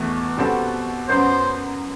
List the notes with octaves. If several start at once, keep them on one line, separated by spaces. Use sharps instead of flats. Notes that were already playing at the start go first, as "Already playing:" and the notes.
Already playing: E2 B2 A3
B2 G3 C4 F#4 A4
F#2 F#3 B3 C5